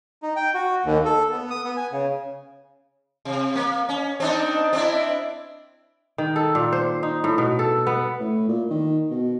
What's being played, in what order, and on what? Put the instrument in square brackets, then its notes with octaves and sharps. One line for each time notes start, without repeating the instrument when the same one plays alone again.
[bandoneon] D#4
G5
F#4
D#2
A4
B3
D#6
B3
G#5
C#3
[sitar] C3
A#3
C#4
C4 D4 D#4
C4 D4 E4
[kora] D#3
A4
A#2
C5
D#4
A2
B2
A4
B3
[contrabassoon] A2
A#2
D#3
B2